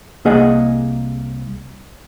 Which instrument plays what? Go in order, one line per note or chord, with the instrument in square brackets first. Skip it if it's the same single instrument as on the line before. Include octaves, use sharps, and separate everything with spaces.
[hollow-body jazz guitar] C2 A#3 G#4 D#5 F#5